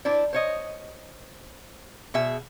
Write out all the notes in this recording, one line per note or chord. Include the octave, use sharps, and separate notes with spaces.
D4 E4 C5 D5
C5 C#5 D#5
B2 G#4 E5